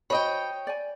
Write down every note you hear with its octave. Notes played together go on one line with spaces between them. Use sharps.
F#4 C5 C#5 D#5 G5 B5
D5 G#5